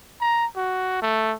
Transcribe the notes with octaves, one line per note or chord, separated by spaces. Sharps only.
A#5
F#4
A3